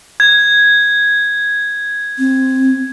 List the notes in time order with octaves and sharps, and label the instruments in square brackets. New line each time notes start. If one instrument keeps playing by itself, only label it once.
[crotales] G#6
[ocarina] C4